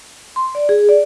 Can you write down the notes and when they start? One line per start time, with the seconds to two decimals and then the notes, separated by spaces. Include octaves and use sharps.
0.36 C6
0.55 D5
0.69 G#4
0.89 D5